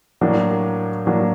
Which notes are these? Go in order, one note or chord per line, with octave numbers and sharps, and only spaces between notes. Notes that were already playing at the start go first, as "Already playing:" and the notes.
A2 F#3 A#3 D4
A2 F#3 A#3 D4